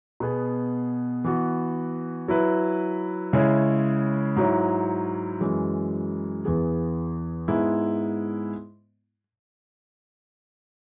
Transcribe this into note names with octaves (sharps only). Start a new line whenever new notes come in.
B2 B3 G#4
E3 B3 F#4
F#3 E4 B4
C#3 G#3 E4 C#5
G#2 F#3 E4 C#5
F#2 E3 G#3
E2 E3 B3 G#4
G#2 G#3 B3 E4